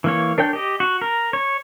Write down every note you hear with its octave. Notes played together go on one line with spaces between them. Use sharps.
E3 A#3 C#5
D4 A#4 C#5 G5 G6
G4 D#5
F#4
A#4
C#5